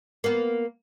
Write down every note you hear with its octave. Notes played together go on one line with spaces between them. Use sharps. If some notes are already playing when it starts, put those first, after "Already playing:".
A#3 B3